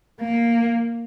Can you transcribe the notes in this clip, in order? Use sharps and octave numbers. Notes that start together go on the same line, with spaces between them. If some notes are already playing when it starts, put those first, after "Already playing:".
A#3